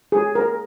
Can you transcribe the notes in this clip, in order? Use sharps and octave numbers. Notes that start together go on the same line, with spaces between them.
G#4
A#4